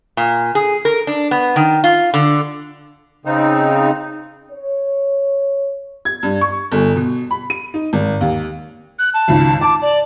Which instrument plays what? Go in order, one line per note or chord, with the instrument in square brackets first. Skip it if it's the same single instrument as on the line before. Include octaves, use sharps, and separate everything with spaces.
[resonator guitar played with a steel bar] A#2
G#4
A#4
D4
B3
D#3
F4
D3
[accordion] C#3 C4 D#4
[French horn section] C#5
[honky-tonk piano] G#6
G2
C#6
G1
B2
B5
D#7
D#4
G#1
D#2
[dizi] F#6
A5
[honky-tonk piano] G#1 C#2 G#2
[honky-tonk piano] A5 [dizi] D6
[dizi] D5